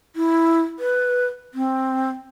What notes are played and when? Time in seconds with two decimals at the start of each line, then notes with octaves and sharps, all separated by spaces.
0.16 E4
0.79 B4
1.54 C4